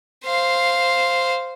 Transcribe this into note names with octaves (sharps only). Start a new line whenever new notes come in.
C5 F5